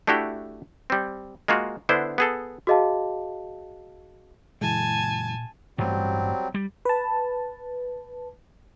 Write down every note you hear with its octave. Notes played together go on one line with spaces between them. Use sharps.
A3 D4 E4 F#4 G4
G3 C4
G#3 A#3 F4 F#4
D3 B3 D4 E4 C5
B3 G#4 A4
F#4 G#4 D#5 F5 A5
F#1 A#2 E3 G#3 G#5 A5
A1 G2 F#3 G3 A3 C4
G3
B4 A5